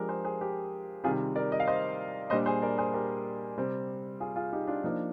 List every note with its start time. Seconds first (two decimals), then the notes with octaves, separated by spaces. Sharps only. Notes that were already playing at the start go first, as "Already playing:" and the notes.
Already playing: F3 G#3 D4 G4 A#4
0.09 G#4 C5
0.24 G#4 C5
0.41 G4 A#4
1.04 C3 D#3 G3 C4 F4 G#4
1.36 A#4 D5
1.52 D#5
1.60 F5
1.67 C5 D#5
2.30 A#2 G3 D4 C5 D#5
2.46 G#4 C5
2.62 A#4 D5
2.78 G#4 C5
2.94 G4 A#4
3.57 C3 G3 C4
4.20 F4 G#4
4.36 F4 G#4
4.52 D#4 G4
4.67 D4 F4
4.84 F3 A#3 D4 D#4